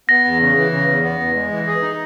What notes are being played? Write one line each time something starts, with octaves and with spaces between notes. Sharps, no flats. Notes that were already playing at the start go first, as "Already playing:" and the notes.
B3 A#6
E2
C#3
E3
C#3
E2
B3
E2
G#3
E3
G#4
D#4